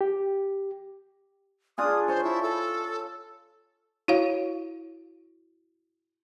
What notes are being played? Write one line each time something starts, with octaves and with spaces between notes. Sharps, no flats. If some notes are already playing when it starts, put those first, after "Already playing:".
G4
D4 F4 G#4 D#6
C5 C#5 A5
E4
A4
E4 F#4 C#5 F5